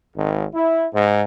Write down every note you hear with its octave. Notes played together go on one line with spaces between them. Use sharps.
G#1
E4
G#2